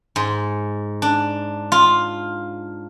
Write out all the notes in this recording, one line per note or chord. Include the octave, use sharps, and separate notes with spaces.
G#2
D4
F4